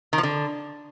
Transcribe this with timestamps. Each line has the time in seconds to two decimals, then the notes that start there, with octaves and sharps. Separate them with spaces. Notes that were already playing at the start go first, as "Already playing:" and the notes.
0.13 D#3
0.18 F3
0.23 D3